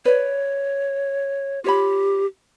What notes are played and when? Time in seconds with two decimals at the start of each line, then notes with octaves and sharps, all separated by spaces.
0.05 B4 C#5 D5
1.64 F4 G4 C#5 B5